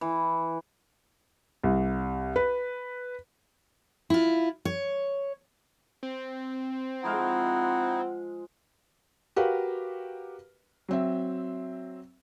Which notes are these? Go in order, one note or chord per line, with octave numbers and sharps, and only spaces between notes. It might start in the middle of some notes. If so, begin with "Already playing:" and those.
E3
C2
B4
E4 F4
C#5
C4
F3 G#3 D#4 E4 F5 F#5
F#4 G4 A#4 B4 F5
F#3 C4 E5